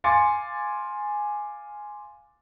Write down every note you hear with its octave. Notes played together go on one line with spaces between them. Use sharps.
F5 G#5 C6 D6 A6 C#7